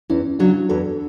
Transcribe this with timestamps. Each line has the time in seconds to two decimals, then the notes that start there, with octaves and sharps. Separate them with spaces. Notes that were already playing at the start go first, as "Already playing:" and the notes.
0.10 E2 C#4 E4
0.39 C#3 F#3 D4 F#4
0.69 E2 F#4 A4